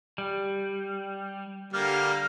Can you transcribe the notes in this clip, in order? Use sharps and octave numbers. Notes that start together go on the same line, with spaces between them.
G3
D3 G3 A#3 F6